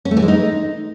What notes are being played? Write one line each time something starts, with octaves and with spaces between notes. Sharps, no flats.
C#4
A3
E3
G#3
D#4